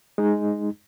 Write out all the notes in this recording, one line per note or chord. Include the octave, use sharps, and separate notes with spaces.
G#3 D#4